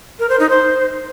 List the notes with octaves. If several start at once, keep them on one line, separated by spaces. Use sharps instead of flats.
A#4
C5
D#4
C5